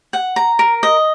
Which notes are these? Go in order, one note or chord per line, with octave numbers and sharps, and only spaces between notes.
F#5
A#5
A#4
D#5